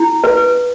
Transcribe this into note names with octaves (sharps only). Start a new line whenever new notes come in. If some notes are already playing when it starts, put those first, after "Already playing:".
Already playing: E4
B4